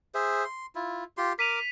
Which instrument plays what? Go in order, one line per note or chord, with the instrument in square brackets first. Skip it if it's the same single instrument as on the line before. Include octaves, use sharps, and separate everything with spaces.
[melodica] G#4 C5 E5
C6
E4 F4
F4 G4 C6
[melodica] A#4 D6 [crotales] B6 D#7 F7